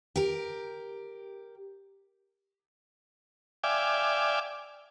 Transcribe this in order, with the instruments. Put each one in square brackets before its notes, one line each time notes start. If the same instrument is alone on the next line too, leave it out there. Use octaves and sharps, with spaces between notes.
[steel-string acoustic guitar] G4 A#4
[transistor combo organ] D5 E5 F5 G5 G#5 D6